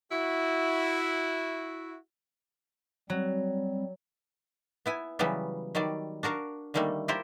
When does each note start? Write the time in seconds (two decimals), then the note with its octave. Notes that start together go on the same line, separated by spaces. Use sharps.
0.12 E4 F#4
3.10 F#3 G3 C4
4.86 B3 E4 G#5
5.19 C#3 E3 F#3 G3 B3
5.75 D#3 F#3 G3 D5
6.23 D4 F#4 A#4 F5
6.74 D3 D#3 G3 A3 A#3
7.08 E4 F4 G4 A#4 C5